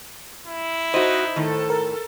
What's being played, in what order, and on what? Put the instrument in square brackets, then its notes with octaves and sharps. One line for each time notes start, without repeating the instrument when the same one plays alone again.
[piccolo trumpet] E4
[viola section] D#4 [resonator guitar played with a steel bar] F#4 D#5 [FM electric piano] C5
[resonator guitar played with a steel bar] A2 D#3 [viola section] A4
[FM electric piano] A#4